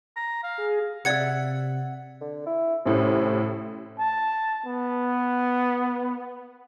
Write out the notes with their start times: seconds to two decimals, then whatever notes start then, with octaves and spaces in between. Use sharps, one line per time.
0.16 A#5
0.43 F5
0.58 G#4
1.05 C3 D5 E5 F#5 G#6 C#7
2.21 D3
2.46 E4
2.85 A1 A2 C3 C#4
3.99 A5
4.66 B3